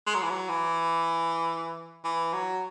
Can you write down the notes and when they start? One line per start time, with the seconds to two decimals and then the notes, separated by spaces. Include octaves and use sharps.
0.07 G#3
0.14 F#3
0.23 E3
0.30 F#3
0.49 E3
2.05 E3
2.33 F#3